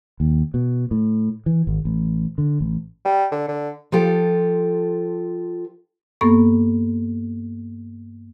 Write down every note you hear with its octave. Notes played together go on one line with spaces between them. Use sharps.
D#2
B2
A2
E3
G#1
A1
D3
A1
G3
D3
D3
F3 F4 G4 A4
G2 A#3 B3 A4 C#6